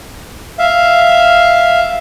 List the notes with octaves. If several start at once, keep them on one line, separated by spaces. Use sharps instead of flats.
E5 F5